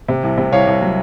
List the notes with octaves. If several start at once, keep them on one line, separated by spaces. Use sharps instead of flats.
C3
C2
C3
C2 C#5 F5
C2
F#3